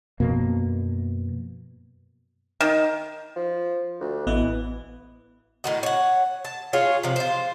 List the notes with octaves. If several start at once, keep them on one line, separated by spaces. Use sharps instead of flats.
F#2 B2 F3 A#3
D#3
F3
D2
A1 E3 B3 D#5
A2 D#3 F#4
C#5 F#5
A5
F4 G#4 C#5
C3 F3
F4 C5